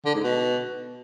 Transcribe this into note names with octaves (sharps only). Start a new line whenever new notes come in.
D3
G#2
B2